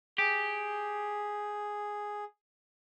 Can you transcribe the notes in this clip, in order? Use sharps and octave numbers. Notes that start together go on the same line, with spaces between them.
G4 G#4